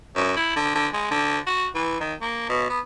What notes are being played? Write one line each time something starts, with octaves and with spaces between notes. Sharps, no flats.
F#2
E4
D3
D3
G#3
D3
F#4
E3
D#3
A#3
B2
B3